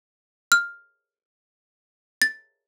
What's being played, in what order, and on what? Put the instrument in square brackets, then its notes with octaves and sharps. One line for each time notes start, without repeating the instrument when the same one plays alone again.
[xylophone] F6
A6